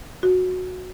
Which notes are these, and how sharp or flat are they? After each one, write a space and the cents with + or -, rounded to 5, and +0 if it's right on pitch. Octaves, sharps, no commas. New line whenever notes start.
F#4 -10